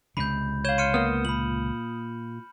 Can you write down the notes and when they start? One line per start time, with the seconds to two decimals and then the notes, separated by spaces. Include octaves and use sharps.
0.17 C#2 C3 B5 G6
0.65 C#5 F5 G6 E7 G7
0.78 C6 F6 C#7 D#7
0.94 A#3 B3 D#6 F6
1.25 A#2 B5 F#7